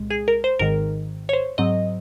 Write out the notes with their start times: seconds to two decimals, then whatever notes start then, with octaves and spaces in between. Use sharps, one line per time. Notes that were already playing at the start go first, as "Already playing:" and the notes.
Already playing: C2 A#2 G#3
0.10 G#4
0.28 A#4
0.44 C5
0.59 G#1 G#2 D#3 A#4
1.29 C#5
1.33 C5
1.58 G#2 F#3 C4 D#5